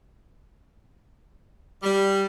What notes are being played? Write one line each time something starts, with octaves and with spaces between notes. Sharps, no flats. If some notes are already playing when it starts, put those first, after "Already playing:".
G3